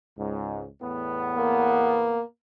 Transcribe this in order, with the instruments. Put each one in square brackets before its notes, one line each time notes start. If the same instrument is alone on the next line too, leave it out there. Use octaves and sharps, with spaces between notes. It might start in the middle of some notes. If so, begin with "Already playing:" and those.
[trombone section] C#2 G#2
E2 A2 B3
[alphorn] A#3